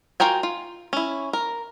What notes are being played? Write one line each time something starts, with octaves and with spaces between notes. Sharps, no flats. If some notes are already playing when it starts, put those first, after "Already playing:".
F4 F#4 A#4 G5 G#5
F4
C#4 E4
A#4